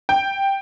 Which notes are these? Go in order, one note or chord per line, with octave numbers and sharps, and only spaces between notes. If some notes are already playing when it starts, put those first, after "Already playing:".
G5